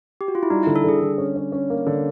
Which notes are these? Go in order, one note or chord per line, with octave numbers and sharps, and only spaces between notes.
G4
F#4
F4
E4
G3 D#4
E4
D3
A4
D3 G#4
D3
C#4
C#4
C#4
A#3
D3